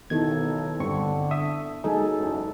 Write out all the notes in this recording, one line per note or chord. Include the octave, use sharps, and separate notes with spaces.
B1 D#3 B3 E4 A4 G#6
G2 D3 C4 C#6
E5 D#6
F#3 G#3 A#3 D#4 G#4 A4 G#5
F#1 E2